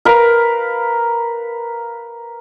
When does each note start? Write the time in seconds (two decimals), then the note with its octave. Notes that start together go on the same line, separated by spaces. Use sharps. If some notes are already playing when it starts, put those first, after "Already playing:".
0.05 A#4 B4 F5